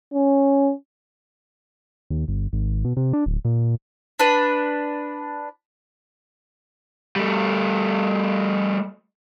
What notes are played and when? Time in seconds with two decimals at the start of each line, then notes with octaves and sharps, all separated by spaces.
0.14 C#4
2.10 D#2
2.28 G1
2.53 G#1
2.85 B2
2.97 C3
3.13 D4
3.26 D1
3.45 A#2
4.19 D4 B4
7.16 G3 A3